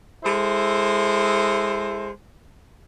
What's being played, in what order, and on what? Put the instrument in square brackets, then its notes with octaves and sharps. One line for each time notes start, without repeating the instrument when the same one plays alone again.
[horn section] G#3 E4 A4 C5